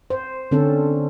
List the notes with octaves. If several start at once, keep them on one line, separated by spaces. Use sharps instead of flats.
C5
D3 C4 C#4 A4